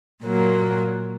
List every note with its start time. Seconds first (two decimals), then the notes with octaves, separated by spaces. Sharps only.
0.23 A#2 F#3 A#3